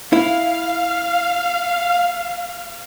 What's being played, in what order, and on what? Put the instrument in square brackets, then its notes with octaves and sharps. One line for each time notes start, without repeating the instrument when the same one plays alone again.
[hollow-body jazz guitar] E4 [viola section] F5